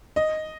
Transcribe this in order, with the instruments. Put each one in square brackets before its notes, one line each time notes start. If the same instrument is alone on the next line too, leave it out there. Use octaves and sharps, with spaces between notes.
[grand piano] D#5